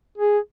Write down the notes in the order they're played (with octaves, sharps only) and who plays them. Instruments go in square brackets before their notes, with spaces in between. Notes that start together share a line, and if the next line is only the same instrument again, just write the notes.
[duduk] G#4